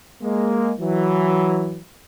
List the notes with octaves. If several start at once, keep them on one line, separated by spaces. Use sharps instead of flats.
G#3 A#3
E3 F#3